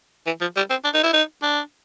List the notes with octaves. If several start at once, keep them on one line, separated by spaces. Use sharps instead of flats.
E3
F3
G3
C4
D4
D#4
E4
D#4
D4